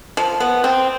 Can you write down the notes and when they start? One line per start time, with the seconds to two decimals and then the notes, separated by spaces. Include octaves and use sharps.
0.17 F3
0.40 B3
0.64 C4